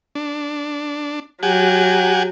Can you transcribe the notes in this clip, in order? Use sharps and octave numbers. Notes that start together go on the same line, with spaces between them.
D4
F#3 G4 F#5 G#5